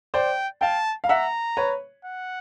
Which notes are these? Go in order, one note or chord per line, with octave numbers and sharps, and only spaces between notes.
C5 D5 G5
F5 G5 A5
F5
E5 F#5 A#5
B4 C#5
F#5